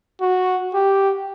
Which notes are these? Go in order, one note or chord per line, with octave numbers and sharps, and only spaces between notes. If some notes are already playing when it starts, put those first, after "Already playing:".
F#4
G4